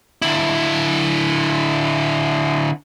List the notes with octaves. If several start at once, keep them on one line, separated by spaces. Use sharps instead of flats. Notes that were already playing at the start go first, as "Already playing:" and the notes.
D3 E4